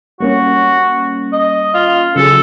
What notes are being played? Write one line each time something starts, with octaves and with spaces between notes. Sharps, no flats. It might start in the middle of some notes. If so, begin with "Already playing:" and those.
G3 A#3 C#4 F#4
D#5
F4
C#3 F#3 G#4 A4